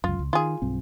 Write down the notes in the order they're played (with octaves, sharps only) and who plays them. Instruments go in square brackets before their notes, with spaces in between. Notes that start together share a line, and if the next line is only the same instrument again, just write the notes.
[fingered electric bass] C#2 F#2 [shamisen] F4
[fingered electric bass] C#2
[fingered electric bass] D#3 [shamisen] F4 G#4
[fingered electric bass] B1 G2 C4